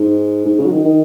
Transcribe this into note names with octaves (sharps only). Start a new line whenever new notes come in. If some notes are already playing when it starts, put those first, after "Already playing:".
Already playing: G#2
G#2
C#3
F#3
D#3
D#3